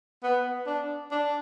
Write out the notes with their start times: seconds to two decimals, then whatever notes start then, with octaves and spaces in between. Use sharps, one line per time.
0.23 B3
0.67 D4
1.11 D4